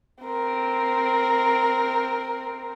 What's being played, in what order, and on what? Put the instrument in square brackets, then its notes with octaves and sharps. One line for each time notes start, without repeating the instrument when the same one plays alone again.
[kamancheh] C4 A#4